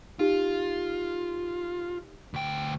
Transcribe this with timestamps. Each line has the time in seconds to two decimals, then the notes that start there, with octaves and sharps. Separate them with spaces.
0.19 D#4 F4 G4
2.34 D2 G5